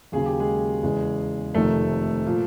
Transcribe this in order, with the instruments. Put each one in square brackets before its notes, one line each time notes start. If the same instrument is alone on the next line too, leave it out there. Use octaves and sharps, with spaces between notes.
[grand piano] D#2 C#3 F#3 G#4
G4
G#3 G#4
E2 C#3 E3 G#3
F1 F2 C3 D#3 A3 A4
A#2 F3